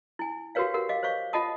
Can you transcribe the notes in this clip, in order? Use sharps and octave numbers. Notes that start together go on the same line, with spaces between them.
E4 G#5
F#4 G4 A#4 B4 C#5 F5
G4 A#4 F#5
D#5 F5 D6
C5 C#5 F5 C#6
F4 D#5 F#5 A5 D#6